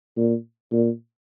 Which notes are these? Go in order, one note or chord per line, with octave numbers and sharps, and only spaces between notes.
A#2
A#2